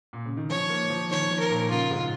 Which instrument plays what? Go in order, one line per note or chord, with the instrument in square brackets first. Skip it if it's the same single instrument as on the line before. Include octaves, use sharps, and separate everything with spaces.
[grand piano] A#2
C#3
D#3
[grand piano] F3 [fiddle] C#5
[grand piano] A#3
F3
[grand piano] D#3 [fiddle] C#5
[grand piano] F3
[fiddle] A#4
[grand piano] A#2
[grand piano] C#3 [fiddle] F4
[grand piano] G#2